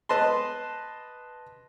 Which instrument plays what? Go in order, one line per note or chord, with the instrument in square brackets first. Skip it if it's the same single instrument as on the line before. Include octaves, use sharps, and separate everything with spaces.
[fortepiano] B4 D#5 A5 C6